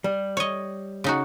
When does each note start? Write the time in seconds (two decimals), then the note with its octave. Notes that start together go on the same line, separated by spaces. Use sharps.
0.04 G3
0.37 C#5 D#5
1.04 C#3 D#4 F#4